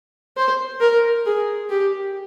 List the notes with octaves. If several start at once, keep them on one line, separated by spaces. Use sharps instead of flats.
C5
A#4
G#4
G4